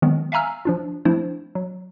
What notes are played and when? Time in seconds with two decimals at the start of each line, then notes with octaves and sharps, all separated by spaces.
0.02 D#3 F#3 G#3 B3 C4
0.32 E5 F5 G#5 A#5 E6 F6
0.65 F3 D4 F4
1.05 F3 A3 C4 D4 E4 C5
1.55 F#3